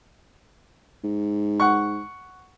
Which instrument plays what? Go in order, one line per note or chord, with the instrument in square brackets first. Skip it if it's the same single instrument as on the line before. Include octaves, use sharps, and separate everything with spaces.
[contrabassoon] G#2
[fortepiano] F#5 C#6